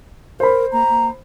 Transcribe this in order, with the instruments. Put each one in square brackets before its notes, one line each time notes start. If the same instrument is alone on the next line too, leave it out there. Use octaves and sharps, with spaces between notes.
[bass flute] A#4 [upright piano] C5 B5
[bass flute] A#3 [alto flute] A#5
[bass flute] A#3